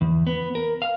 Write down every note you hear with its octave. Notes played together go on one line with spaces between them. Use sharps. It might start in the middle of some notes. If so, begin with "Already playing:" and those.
E2
B3
A#4
F5